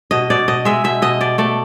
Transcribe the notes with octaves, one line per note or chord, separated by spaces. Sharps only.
B2 D#5
B2 D5
B2 D#5
G#3 E5
B2 E5
B2 D#5
B2 D5
A3 D5